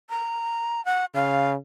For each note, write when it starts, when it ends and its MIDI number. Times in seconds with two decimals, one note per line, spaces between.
0.10 0.84 82
0.85 1.05 78
1.14 1.55 49
1.14 1.51 77